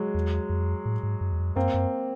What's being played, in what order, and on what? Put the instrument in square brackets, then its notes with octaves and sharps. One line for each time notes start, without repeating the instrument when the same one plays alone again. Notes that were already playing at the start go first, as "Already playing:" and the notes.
Already playing: [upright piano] F#3 G#3
[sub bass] E2
F2
A2
G#2
F#2
E2
F2
[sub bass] F#2 [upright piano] A#3 C4
[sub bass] F#2